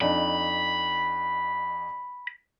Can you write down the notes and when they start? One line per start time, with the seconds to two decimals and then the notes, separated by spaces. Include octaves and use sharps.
0.01 F2 D4 D#4 B5